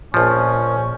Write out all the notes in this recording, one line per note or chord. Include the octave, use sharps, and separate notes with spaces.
A#1 A#2 F3 C#4